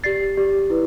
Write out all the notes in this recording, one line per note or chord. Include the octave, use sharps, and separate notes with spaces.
G4 D5 A6 C7
G4 D5
E4 B4